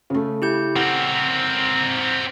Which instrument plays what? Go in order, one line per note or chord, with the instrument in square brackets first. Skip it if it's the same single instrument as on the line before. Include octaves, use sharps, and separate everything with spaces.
[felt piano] C#3 A3
[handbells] E4 G4 G6
[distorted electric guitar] C4 A#4 [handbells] F#5